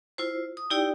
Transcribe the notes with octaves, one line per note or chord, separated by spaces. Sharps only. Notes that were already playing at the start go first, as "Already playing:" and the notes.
E4 F4 C5
D#6
D#4 E4 G4 D5 G5